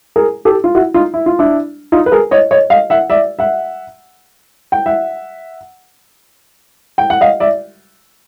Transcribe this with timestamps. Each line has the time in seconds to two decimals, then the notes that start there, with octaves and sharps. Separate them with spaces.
0.16 G#4 A#4
0.45 G4 A4
0.64 F4
0.75 E4 F#4
0.94 D#4 F4
1.14 E4
1.26 F4
1.39 D4 E4
1.92 D#4 F4
2.06 B4
2.12 G#4 A#4
2.31 C#5 D#5
2.51 C#5 D#5
2.70 D#5 F5
2.90 E5 F#5
3.10 D5 E5
3.39 E5 F#5
4.72 G5
4.86 E5 F#5
6.98 G5
7.10 F#5
7.21 D#5 F5
7.40 D5 E5